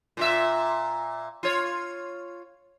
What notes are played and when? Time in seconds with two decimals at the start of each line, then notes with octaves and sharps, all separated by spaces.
0.17 A#2 F4 E5
1.43 F4 C#5